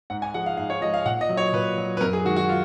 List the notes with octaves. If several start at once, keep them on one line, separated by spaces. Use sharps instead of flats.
G#2 F#5
G#5
F3 G#3 F#5
F5
G#2 F5
C#5
F3 G#3 D#5
F5
A#2 F#5
D#5
F#3
C#5
A#2 B4
F#3
B4
F#2 A#4
G#4
D#3 G#3 F#4
F#4
F4